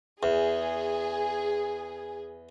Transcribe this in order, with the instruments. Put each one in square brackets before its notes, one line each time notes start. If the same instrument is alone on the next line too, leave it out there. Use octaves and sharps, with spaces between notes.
[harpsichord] E2 [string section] G#4